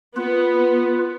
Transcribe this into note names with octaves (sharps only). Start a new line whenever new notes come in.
B3 F4 B4